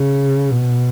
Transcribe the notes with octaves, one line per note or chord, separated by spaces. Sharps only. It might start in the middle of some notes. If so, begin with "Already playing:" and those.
Already playing: C#3
B2